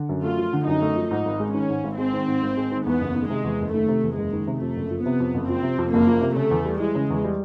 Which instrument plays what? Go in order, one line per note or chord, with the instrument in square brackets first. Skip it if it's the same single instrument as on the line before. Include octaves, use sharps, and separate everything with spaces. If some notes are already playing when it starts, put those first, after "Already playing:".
Already playing: [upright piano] D3
F#2
[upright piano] A3 [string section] F4
[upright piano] F3
D3
[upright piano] F#2 [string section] D#4
[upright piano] A3
F3
[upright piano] G#2 [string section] D#4
[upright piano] G#1
G#3
[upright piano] D#3 [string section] C#4
[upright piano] G#2
G#1
[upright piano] G#3 [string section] C4
[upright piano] D#3
G#2
G#1
G#3
D#3
[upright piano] E2 [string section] B3
[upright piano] F#1
D#3
[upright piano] C3 [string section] G#3
[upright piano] E2
F#1
[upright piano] D#3 [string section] A3
[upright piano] C3
E2
[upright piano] F#1 [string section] G#3
[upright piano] D#3
C3
[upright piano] F2 [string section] A3
[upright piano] F#1
F3
[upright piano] C3 [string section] B3
[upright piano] F2
F#1
[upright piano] F3 [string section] C4
[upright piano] C3
F2
[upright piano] F#1 [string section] A#3
[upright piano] F3
C3
[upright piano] C#3 [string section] A3
[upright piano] E2
G3
[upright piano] E3 [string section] G#3
[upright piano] C#3
E2
G3